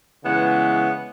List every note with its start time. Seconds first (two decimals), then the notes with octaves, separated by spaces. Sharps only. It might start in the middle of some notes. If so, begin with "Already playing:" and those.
0.23 C#3 E3 G#3 B3